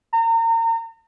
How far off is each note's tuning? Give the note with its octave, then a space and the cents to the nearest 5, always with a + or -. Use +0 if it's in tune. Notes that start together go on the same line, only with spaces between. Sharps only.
A#5 -35